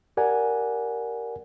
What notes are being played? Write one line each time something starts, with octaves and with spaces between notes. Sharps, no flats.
G4 A#4 D5 F#5 G#5